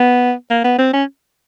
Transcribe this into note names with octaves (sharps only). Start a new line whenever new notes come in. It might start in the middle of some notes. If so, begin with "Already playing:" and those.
Already playing: B3
A#3
B3
C4
C#4